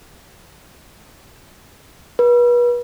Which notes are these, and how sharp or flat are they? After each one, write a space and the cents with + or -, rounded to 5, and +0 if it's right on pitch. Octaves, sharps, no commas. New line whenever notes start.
B4 -35